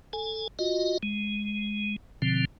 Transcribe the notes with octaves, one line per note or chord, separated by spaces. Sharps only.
A4 G#5
F4 F#4 D#5
G#3
B2 D3 F3 C4